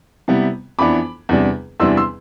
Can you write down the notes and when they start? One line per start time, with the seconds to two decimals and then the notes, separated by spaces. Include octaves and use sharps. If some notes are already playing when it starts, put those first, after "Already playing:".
0.28 C3 G3 B3 E4
0.79 F2 E3 B3 D4 B5 D6
1.29 E2 C3 G3 D4
1.80 E2 C3 E3 G3 D4 C6 E6
1.97 C6 E6